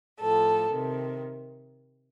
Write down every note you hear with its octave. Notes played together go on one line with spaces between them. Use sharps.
A2 F3 A4
C3 D#3